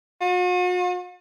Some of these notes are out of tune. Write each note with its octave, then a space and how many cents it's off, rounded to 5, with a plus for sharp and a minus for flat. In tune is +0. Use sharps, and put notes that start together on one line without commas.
F#4 -45